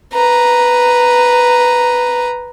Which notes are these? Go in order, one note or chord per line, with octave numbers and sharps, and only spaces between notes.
B4 A#5